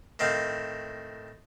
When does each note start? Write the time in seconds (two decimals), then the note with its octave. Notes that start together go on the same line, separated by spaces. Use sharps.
0.19 A2 D#3 C4 F5